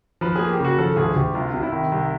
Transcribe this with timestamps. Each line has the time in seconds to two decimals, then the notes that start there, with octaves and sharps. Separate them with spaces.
0.21 F3 B4
0.35 A#3 G#4
0.50 G4
0.59 C#3
0.65 F#4
0.78 F3 A4
0.96 D2 G#4
1.16 D2 G4
1.34 C2 F4
1.54 C3
1.63 E4
1.72 D#3
1.92 C2